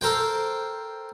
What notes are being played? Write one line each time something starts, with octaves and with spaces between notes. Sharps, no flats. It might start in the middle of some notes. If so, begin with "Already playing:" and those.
A4 A#4 C5 G5